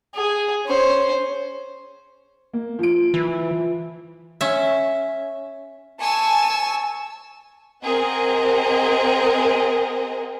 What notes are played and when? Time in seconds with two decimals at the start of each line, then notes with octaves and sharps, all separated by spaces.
0.15 G#4
0.66 C#4 C5
2.53 A#3
2.79 F3 D7
3.14 E3
4.41 C#4 E5
6.01 G#5 A5 C#6 E6
7.82 C4 G#4 A#4 D#5 F#5